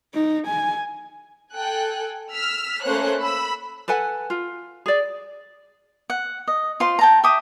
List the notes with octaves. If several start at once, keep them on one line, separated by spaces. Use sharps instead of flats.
D#4
G#5
A4 G5 G#5 F#6
E6 F6 B6
A3 A#3 C#4 C5 C#5 F#6
B5 E6
A4 B4 F#5 G#5
F4
G#4 D5
F#5
D#5
F4 C5 C6
G5 A5 A#5
E5 G5 D6 D#6